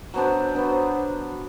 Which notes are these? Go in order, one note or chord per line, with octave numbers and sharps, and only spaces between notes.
F#3 B3 D4 C5
F#3 B3 D4